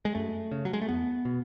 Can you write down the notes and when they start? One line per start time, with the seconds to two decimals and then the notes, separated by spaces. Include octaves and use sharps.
0.05 G#3
0.15 F#2 A3
0.51 C#3
0.65 F#3
0.73 G#3
0.81 A3
0.89 E2 B3
1.25 B2